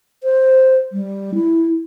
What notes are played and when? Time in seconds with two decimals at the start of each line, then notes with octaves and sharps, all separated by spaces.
0.24 C5
0.92 G3
1.34 E4